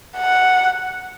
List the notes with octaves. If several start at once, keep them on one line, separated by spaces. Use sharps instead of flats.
F#5